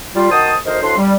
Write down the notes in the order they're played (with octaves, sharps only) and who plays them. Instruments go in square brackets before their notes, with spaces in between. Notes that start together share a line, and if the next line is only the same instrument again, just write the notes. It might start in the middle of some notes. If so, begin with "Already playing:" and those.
[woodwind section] G3 F4
D#3 F#4 C5 A5 D#6
D2 D#4 A#4 C5
D2 A2 D4 C6
G3